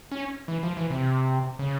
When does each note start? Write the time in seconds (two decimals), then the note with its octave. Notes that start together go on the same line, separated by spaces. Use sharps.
0.12 C#4
0.48 E3
0.63 F3
0.77 E3
0.90 C3
1.59 C#3